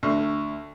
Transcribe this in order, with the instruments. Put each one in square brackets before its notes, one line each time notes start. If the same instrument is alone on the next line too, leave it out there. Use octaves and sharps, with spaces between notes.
[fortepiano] D2